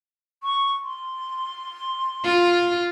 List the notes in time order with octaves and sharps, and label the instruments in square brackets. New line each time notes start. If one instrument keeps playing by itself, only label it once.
[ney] C#6
C6
[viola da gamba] F4